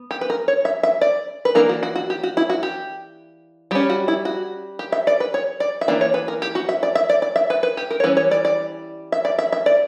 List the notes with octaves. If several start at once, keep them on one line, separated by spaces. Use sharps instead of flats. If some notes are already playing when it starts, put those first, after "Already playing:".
Already playing: B3
G4
B4
A#4
C#5
E5
E5
D5
B4
E3 A#3 D4 A#4
F#4
F#4
F#4
G4
F#4
E4
F#4
G4
G3 C#4 G4
F#4
E4
F#4
G4
E5
D5
B4
C#5
D5
E5
E3 A#3 D4 D5
C#5
B4
A#4
G4
F#4
E5
D5
E5
D5
D5
E5
B4
B4
G4
A#4
C#5
E3 G3 C#4 B4
C#5
D5
D5
E5
D5
E5
E5
D5